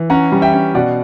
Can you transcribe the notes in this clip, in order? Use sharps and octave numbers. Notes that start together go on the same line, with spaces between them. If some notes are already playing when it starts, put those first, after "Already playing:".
Already playing: E3
C#4 F#5 A#5
G3
E5 G5
C#4
B2 D5 F#5